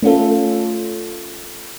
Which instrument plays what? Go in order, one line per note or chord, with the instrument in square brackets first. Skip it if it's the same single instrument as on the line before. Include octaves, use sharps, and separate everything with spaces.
[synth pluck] A3 C#4 F4 A4